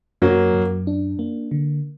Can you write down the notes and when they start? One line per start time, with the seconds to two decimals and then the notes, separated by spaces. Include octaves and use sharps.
0.22 F#2 F#3 A#3
0.55 F#2
0.87 D4
1.19 A#3
1.51 D3